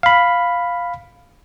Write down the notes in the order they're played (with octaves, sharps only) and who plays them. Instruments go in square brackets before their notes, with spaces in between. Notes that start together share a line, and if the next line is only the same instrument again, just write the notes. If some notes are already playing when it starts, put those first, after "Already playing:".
[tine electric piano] F5 B5